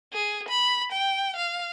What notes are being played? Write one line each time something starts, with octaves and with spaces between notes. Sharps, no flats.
G#4
B5
G5
F5